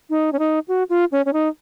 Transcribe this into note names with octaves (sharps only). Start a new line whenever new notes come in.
D#4
C#4
D#4
F#4
F4
C#4
C#4
D#4